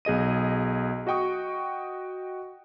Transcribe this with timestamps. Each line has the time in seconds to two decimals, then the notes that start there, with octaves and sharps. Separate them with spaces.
0.05 B1 G#4 D#5 D#7
1.07 F#4 D#5 G5 C#6 D#6